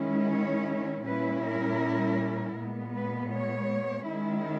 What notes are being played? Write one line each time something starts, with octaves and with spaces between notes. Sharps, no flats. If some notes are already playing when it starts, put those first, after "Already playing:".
Already playing: D#3 G#3 C#4 E4
C#5
A#2 G3 C#4 E4 B4
A#4
A#2 G#3 B3
B4
C#5
D#3 G#3 C#4 E4